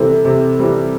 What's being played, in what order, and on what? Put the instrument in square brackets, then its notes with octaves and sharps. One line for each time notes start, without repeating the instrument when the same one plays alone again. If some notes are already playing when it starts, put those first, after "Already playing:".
Already playing: [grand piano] C3 E3 G3 C4 [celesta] A4
[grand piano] C3
E3 G3 C4